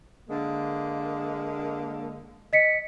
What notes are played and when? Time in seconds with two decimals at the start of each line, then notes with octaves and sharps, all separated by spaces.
0.30 D3 G#3 A#3
2.53 D#5 B6 C#7